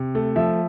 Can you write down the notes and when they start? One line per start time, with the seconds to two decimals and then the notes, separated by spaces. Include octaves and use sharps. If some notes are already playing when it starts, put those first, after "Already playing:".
Already playing: C3
0.15 A3
0.36 F3 E5